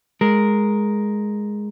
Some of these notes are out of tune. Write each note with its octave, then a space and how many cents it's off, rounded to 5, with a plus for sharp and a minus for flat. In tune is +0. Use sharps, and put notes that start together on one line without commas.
G#3 +0 A#4 +0